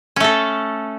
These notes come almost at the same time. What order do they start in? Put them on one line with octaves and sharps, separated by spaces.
C#4 A3 A4